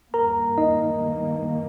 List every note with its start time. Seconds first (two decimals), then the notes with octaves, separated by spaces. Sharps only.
0.14 G2 D#3 A#3 A#4 A#5
0.58 D#4 D#5